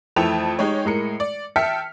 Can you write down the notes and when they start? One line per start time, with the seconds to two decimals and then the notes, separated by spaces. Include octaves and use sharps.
0.16 F2 E3 A3 G5 A5 F7
0.59 G#3 D#4 G4 C#5
0.85 A2 G#3 A#4 C#7
1.20 D5
1.56 E5 G5 A5 F6 B6 C#7